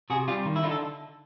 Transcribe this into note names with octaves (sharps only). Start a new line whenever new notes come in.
C3 F#4 G#4
G3 F4 G4
D#3
E4
D3 D#4 F4
A4